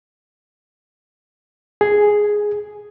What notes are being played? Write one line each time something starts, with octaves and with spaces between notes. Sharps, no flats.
G#4